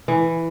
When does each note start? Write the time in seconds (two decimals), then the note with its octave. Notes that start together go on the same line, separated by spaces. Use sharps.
0.08 E3